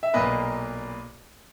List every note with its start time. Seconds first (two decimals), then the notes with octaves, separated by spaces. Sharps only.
0.03 E5
0.14 B1 A#2 A#3 B4 D#5